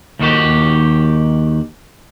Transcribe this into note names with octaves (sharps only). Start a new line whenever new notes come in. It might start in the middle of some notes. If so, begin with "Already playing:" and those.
D#2 D#3 F#4 G4